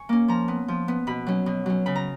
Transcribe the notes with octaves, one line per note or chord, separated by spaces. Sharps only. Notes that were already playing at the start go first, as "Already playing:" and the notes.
Already playing: G#5 C#6
A#3 C#4
F3 A#5
B3
F3
B3
B2 B5
F#3 C#4
B2
F#3 C#4
C#3 B5
A#5